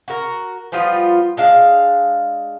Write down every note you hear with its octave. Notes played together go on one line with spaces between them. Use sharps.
F#4 A#4
F3 G3 B3 F4
G#3 D4 F5